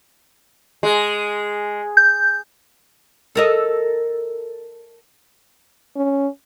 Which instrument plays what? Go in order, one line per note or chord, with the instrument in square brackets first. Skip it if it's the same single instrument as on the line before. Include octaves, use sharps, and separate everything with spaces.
[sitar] G#3
[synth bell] G6
[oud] A4 A#4 D#5
[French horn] C#4